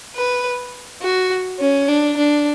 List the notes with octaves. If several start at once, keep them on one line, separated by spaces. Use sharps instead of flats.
B4
F#4
C#4
D4
D4